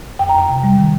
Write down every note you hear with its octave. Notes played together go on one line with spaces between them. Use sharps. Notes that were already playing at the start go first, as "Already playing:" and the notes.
F2 G5
A#5
F2 G5
C3
G3
D#3